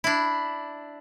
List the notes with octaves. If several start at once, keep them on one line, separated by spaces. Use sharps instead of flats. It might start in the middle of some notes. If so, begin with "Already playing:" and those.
D4 E4